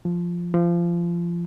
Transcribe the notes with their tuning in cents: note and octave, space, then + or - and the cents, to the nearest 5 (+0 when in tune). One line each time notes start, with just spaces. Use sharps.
F3 -5
F3 -25